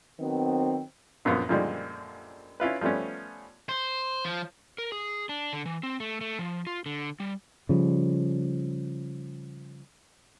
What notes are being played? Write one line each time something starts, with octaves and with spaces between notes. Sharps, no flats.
D#3 F#3 B3 C4
A#1 F#2 A#2 F3 B3 F5
F#2 A#2 D3 F3 G3 G#3
C#4 E4 F4 B4
F3 G3 A3 B3 C#4
C5
F3
A#4
G#4
D4
D3
E3
C4
A3
A3
F3
F4
D3
G3
C#3 F3 G3